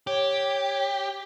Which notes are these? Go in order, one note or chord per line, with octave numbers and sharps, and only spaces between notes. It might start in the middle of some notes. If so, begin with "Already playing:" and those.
G4 C#5